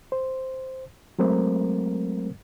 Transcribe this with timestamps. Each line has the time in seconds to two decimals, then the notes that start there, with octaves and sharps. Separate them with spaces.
0.12 C5
1.19 F#3 G#3 A3 C4 A#4 C5